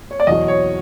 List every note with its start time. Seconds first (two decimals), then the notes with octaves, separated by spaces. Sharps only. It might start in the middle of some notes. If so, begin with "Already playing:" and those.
0.11 C#5
0.20 D5
0.27 E2 B2 F#3 D#5
0.48 C#5